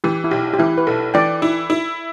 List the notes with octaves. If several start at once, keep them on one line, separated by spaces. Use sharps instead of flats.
E3 G4
E4
B1 G4
G4
E3 E4
B4
B1 A4
E3 D5 G5
E4
E4